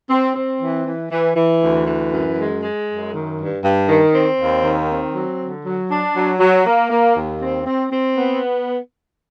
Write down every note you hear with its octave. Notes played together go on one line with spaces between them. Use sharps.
C4
C4
E3
E3
E3
E3
D2
E3
F#2
G#3
G#3
F#2
D#3
G2
G2
D#3
C4
D#2
D#3
C4
F#3
D3
F#3
D4
F#3
F#3
A#3
A#3
D#2
C4
C4
C4
B3